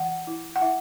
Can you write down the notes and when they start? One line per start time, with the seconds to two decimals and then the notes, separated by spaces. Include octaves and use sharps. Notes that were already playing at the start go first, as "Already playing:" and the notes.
Already playing: E3 F#5
0.27 E4
0.56 F#5
0.61 E4 E5